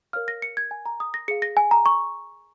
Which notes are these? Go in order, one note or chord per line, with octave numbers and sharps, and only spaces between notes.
A#4 C#5 F5 F6
A#6
C#7
G#6
G#5
A#5
D#6
A#6
G#4 F5 C#7
A#6
G#5
A#5
C#6